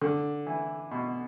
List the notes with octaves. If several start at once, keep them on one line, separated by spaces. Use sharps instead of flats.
D3
E3
B2